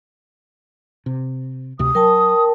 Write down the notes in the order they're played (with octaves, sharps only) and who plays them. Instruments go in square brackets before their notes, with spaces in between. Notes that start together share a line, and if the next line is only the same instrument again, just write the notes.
[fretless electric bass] C3
[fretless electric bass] D2 C3 [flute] D#6
[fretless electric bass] F#3 [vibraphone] A#4 G5 A5